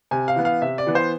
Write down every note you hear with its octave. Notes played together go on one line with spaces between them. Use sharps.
C3 G#5
F5
E3 B3
F5
C3 E5
D5
E3 B3
C5